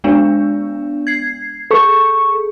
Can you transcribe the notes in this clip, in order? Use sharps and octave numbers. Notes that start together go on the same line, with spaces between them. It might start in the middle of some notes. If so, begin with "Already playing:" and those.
G#3 B3 D4
G#6 C7
G#4 A4 C#6